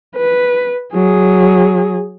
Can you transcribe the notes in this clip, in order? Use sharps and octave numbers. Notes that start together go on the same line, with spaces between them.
B4
F#3 G#4